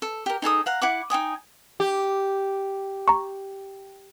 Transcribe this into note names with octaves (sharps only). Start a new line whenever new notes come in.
A4
G4 A#4
D#4 G#4 A4 D#6
F5 F#5 A#5
E4 F#5 D6
D#4 G5 G#5 D#6
G4
A#5 C#6